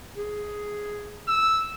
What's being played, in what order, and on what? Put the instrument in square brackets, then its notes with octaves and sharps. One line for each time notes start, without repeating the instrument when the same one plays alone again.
[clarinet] G#4
[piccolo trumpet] E6